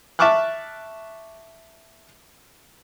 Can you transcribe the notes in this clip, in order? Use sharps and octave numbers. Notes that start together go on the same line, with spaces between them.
E5 A5 C#6 D6 F6 F#6